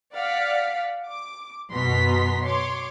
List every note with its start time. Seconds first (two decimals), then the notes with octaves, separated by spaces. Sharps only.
0.13 D5 F5 F#5 B6
1.07 D6
1.71 F#2 B2 B3 A#5 C6 B6
2.43 C#5 C6 D6